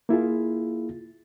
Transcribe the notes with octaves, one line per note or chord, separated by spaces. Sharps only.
A#3 E4 F4 G#4